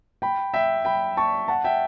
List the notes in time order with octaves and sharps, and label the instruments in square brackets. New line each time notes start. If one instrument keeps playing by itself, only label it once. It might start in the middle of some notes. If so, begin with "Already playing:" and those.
[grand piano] G5 B5
E5 G5
G5 B5
A5 C#6
F#5 A5
E5 G5